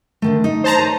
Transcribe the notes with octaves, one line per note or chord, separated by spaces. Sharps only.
D3 D#3 A3
D#4
C5 A5 A#5
B4 C#5